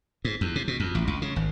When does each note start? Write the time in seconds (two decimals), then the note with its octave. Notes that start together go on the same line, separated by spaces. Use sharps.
0.25 G#2
0.41 E2
0.56 C3
0.68 B2
0.80 F2
0.95 A1
1.07 C#2
1.22 C#3
1.36 G#1